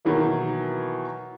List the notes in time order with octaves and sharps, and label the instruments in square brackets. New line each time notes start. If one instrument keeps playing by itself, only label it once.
[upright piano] B2 D#3 E3 F#3 A#3